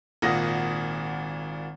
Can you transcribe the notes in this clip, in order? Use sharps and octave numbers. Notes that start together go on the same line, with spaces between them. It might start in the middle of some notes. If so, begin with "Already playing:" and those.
G#1 A#2 F4 F#5 D#6 A#6